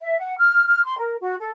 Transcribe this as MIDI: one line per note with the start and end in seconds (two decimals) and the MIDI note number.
0.01 0.17 76
0.19 0.35 78
0.38 0.64 89
0.67 0.84 89
0.84 0.99 84
0.99 1.16 70
1.20 1.36 66
1.40 1.51 69